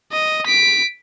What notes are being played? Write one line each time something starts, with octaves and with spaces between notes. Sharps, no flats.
D#5
B6 D7